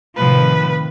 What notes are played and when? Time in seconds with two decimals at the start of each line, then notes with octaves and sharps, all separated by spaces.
0.17 A2 C3 D#3 F3 B4